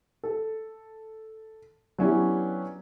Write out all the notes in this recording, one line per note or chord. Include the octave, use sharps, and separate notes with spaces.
A4
F#3 B3 C#4 D4 E4 G4